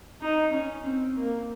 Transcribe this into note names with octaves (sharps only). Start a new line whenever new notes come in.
D#4
C#4
C4
A#3